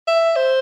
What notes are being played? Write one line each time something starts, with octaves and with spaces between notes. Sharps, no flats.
E5
C5